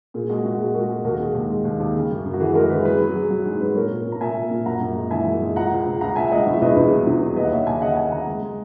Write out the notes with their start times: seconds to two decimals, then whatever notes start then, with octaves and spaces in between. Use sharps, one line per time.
0.14 A#2 G#4
0.29 G#3 F#4
0.44 A#2 F#4
0.59 G#3 F#4
0.74 G#3 F#4 A#4
0.90 G#3 G#4
1.04 D#2 F#4 A#4
1.20 G#3 G#4
1.34 D#2
1.50 G#3
1.65 D#2
1.80 D#2
1.96 C#3
2.10 F#2
2.25 F#2
2.34 F#4
2.40 E3 G#4
2.55 G#3 F#4 A#4
2.70 E3 G#4 B4
2.85 F#3 G#4 B4
3.00 F#3
3.08 G#4
3.16 F#3
3.23 G#4
3.30 F#3 F#4
3.45 G#2 G#4
3.61 F#3 G#4 B4
3.76 A#2 A#4 C#5
3.91 A#2
4.06 A#2
4.12 A#5
4.21 A#2 E5 G#5
4.36 A#2
4.51 A#2
4.66 F#2 F#5 A#5
4.81 F#2
4.96 G#3
5.10 E3 E5 G#5
5.26 F#2
5.41 G#3
5.56 C#2 F#5 A#5
5.71 C#2
5.87 C#2
6.01 C#2 F#5 A#5
6.16 C#2 E5 G#5
6.32 C#2 D#5 F#5
6.47 E2
6.53 E5
6.62 E2 B4 D#5
6.76 E2 G#4 B4
6.92 F#3
7.07 E2
7.22 F#3
7.36 D#2 B4 D#5
7.45 F#5
7.51 D#2 C#5 E5
7.67 D#2 E5 G#5
7.82 C#3 D#5 F#5
7.97 C#3 E5 G#5
8.12 C#3 F#5 A#5
8.27 G#3
8.42 G#3